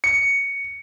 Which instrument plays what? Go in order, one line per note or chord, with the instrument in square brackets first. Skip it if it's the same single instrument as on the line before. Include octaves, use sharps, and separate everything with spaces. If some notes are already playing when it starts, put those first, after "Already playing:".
[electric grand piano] C#7